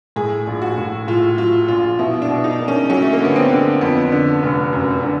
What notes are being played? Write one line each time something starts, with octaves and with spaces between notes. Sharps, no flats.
A2 G#4
A#1
F#4
A2
A2 F4
F#3 F4
A#1 F4
B2 E4
D4
B2
D#4
A#3
C#4
F#3 C#4
A3
A#3
D3 B3
C4
D3
F2 B3
D3
F1
F#2
D3